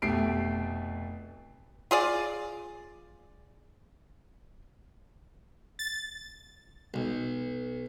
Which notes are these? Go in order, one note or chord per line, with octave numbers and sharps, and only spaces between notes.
F1 B2 A3 G4 C7 D7
F4 G#4 D5
A6
B1